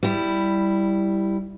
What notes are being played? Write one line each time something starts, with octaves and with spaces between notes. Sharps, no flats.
G3 E4